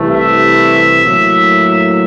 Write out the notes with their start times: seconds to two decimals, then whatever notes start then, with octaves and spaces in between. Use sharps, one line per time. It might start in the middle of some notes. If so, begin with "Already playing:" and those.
Already playing: C2 C3 E3 A3
0.10 E5
1.04 A2 F#3 A#3